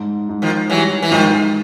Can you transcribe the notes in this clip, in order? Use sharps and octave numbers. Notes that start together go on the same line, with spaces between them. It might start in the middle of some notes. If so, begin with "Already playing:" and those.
Already playing: G#2
G#2
D#3 F3
E3 F#3 G3
E3
G#2 D#3 F3